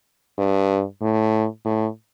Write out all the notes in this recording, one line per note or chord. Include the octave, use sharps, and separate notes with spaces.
G2
A2
A2